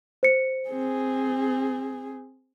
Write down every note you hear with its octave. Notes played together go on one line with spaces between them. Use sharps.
C5 C#7
C4 G#4